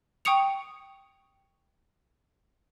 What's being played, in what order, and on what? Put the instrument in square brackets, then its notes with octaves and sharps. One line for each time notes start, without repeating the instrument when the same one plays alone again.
[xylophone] G5 C#6 D#6 C#7 F7